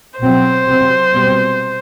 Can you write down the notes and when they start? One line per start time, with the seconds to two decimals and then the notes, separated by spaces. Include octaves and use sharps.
0.20 B2 F#3 C4 C5
0.66 C3 F#3 C4
1.13 B2 G3 C4